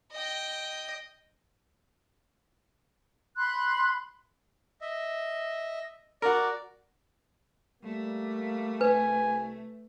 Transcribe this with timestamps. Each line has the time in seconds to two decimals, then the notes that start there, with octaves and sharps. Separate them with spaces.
0.12 D#5 G5
3.37 B5 C6 F#6
4.81 D#5 E5
6.22 F#4 A#4 D5
7.84 G3 A3 A#3
8.81 C2 B4 G#5